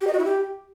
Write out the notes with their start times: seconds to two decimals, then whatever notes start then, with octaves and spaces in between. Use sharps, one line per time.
0.01 G4
0.07 D#5
0.13 F#4
0.19 E4
0.25 G4